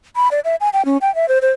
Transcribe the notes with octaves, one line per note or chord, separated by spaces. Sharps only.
B5
D5
E5
G#5
G5
C#4
G5
E5
C5
C5